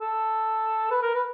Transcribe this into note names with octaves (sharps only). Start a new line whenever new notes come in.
A4
B4
A#4
B4